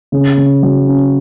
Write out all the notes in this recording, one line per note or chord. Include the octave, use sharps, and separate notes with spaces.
C#3
C#3
F#3
C#4